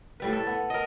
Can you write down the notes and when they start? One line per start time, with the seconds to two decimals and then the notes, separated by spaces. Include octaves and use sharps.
0.20 A2 G3 B4
0.32 A4
0.47 B3
0.70 A#4 D#5